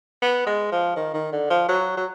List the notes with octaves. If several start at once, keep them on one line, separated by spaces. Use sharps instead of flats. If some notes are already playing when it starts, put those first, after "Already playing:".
B3
G#3
F3
D#3
D#3
D3
F3
F#3
F#3